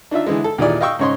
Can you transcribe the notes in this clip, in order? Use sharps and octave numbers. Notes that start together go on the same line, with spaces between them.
D4 D#4 F4 E5
D3 E3 G#3
A4
D#2 A#2 E3 G#4 D5
D#5 F5 G5 C#6 E6
G#2 C#3 C#5 D#5 C6